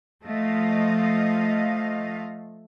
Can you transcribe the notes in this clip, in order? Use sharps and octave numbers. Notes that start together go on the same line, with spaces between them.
F3 A3 D#5 F5